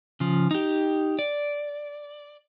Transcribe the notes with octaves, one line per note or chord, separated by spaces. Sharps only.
C#3 F3
D#4 G4
D5